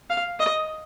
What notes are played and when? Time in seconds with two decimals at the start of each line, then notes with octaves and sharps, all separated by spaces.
0.10 F5
0.40 D#5